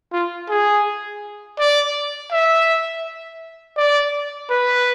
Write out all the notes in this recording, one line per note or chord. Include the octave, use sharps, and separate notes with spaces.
F4
G#4
D5
E5
D5
B4